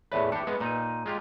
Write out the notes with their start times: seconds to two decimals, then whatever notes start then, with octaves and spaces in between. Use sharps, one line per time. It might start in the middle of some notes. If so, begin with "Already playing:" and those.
0.12 E2 A2 B4 C#5 D5 E5
0.32 D4 G4 C#7
0.47 G#3 B3 B4
0.60 A#2 D#4 A#5 D#7
1.06 G#3 F4 G4